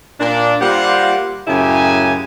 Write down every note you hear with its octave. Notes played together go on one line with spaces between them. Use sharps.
A#2 D4
G3 A#3 F4 G4 C5 F#5
F#2 A2 C#3 E4 G4 G#5